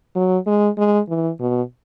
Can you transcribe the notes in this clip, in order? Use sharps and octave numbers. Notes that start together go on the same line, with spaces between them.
F#3
G#3
G#3
E3
B2